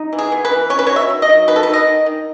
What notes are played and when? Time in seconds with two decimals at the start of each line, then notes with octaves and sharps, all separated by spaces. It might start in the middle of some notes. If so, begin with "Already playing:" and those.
Already playing: D#4
0.13 E3
0.18 G#4
0.32 B3
0.45 B4
0.51 E3
0.70 C#4 C#5
0.79 B4
0.87 F#3 C#5
0.96 E5
1.10 D#3
1.22 D#5
1.29 F#3
1.48 D#3 B4
1.56 A4
1.63 D#3 B4
1.73 D#5
1.87 D#3
2.06 D#3